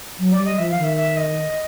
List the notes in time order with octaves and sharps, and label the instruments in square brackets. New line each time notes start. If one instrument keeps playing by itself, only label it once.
[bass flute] F#3
[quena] D5
[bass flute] G3
[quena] D#5
[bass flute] F3 [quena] E5
[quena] F5
[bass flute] D#3
[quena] E5
E5
D#5